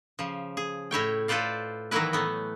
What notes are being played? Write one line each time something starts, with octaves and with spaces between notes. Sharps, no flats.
C#3 F3
G#4
A2 E4 C#5 G5
F4 A4 B4 C5 D5 F5
D#3 E3 F#3 A#3 E4 B4
A2 A3 B3